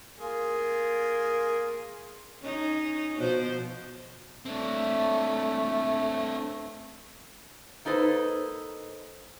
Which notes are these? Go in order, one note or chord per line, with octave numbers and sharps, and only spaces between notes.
A#3 F4 G#4
C#4 D#4
B2 F3 C5
A3 C4 D4
A#3 D#4 A4 B4 C5